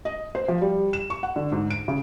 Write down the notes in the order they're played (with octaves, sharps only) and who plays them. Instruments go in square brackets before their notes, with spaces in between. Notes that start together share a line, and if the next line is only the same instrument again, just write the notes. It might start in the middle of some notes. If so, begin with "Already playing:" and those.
[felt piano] D#5
C5
F3
G3
E7
C#6
F#5
D3
G#2
D7
C#3